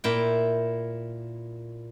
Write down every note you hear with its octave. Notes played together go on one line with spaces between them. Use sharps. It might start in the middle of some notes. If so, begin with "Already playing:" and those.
A#2 E4 G5